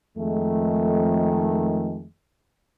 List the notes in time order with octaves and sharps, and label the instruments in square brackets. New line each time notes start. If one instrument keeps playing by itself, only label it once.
[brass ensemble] F2 D#3 G#3 A3